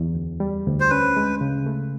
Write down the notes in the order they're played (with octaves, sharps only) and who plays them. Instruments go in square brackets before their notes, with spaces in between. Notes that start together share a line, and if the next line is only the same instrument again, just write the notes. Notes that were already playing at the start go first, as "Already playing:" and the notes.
Already playing: [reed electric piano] E2
D2
G3
D2
[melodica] C5
[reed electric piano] C#4 [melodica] B4
[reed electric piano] G#3
C#3
A3